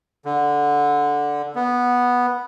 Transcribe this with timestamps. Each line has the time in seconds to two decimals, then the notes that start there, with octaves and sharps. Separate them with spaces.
0.25 D3
1.55 B3